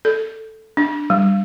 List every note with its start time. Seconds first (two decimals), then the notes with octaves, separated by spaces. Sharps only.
0.05 A4
0.77 D4
1.10 G3